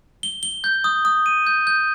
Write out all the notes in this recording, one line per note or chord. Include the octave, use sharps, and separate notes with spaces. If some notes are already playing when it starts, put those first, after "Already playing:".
G7
G7
G6
D#6
D#6
D#7
G6
G6